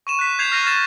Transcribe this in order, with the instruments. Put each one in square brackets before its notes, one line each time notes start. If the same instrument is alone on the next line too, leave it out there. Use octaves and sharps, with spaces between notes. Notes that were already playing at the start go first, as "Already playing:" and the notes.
[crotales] C#6 D#7 E7
F#6 B6
G6 G#6 C7 E7 F7
F6 A#6 D#7
F6 A6 D#7 E7